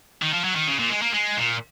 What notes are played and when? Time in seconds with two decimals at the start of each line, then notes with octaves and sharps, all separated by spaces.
0.22 D#3
0.33 F3
0.44 F#3
0.56 D#3
0.68 C#3
0.79 A#2
0.90 G#3
1.02 A#3
1.14 G#3
1.37 A#2